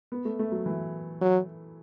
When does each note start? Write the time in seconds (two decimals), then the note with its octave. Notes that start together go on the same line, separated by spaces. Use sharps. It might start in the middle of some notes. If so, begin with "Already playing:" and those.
0.12 B3
0.25 A3
0.39 A3
0.52 F#3
0.66 E3
1.21 F#3